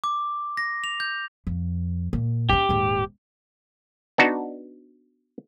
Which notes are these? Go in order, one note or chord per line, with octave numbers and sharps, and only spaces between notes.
D6
A#6
F7
G6
F2
A#2
C#4 D#4 G4
D#1 G#2
B3 D4 D#4 F#4